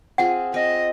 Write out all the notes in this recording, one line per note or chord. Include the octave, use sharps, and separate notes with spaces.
C4 F4 G#4 F#5
C4 D#5